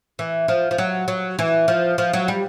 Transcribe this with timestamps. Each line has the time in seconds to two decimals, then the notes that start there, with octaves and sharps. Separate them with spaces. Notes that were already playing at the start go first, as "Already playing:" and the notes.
0.19 E3
0.48 F3
0.71 F3
0.78 F#3
1.08 F#3
1.39 E3
1.68 F3
1.98 F3
2.13 F#3
2.28 G3